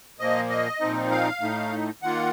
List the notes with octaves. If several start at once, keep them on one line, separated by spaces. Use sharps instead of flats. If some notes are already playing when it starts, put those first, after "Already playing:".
A#2 F3 A#3 D#5
D#5
A#2 F3 C4 D#4
F5
A2 A3 D#4
D#3 A#3 F4 F#5